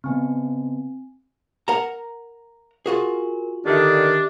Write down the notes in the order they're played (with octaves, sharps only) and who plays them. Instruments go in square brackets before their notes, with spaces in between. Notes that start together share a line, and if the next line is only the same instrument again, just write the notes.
[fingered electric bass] C#3 B3 [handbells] C4 G#5
[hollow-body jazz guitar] A#4 F#5 A#5
[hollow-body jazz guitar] F4 F#4 G#4 [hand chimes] A#4 G#5
[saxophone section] D3 D#3 [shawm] D4 [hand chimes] G4 E5